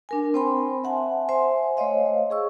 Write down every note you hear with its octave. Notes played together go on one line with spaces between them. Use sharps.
D4 A#4 G#5
C4 C5 G5 B5 C6
E5 F#5 G#5 A5
C5 E5 G#5 C6
A3 C5 C#5 D#5 F5
G#4 C#6 E6